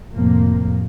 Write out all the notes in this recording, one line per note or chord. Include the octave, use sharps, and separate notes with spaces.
F2 A2 C3 F3 A#3